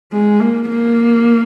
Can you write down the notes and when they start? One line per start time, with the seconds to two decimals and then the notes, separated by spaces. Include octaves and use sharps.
0.12 G#3
0.40 A#3
0.69 A#3